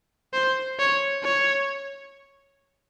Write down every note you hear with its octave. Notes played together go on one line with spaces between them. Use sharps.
C5
C#5
C#5